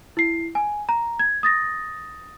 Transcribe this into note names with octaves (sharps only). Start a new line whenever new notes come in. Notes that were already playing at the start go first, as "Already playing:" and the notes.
E4 C7
G#5
A#5
G#6
D#6 A6 A#6